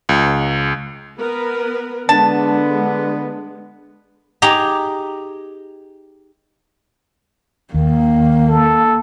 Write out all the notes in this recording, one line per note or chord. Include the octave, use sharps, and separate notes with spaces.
C#2
B3 A#4 B4
D3 G#3 B3 D4 A5
D#4 G4 G#4 A#5
D#2 D#3 A#3
A4